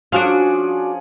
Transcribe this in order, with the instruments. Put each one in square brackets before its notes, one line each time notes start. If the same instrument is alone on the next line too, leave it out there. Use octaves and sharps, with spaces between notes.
[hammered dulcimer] F3 C#4 G#4 [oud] D4 F#4 F5